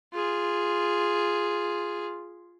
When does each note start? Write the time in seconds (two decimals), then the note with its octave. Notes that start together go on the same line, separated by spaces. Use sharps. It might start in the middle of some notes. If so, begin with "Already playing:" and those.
0.13 F4 G#4